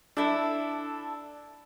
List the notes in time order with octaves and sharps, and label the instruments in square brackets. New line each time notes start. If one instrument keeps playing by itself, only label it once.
[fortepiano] D4 [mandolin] E4 A4